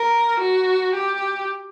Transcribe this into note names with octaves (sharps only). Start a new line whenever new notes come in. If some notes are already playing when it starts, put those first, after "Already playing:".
Already playing: A#4
F#4
G4